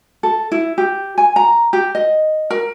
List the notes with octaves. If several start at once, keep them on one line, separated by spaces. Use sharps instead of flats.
A4
E4
G4
G#5
A#5
G4
D#5
A#4